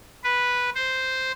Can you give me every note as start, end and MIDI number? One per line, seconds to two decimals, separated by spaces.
0.24 0.70 71
0.75 1.32 72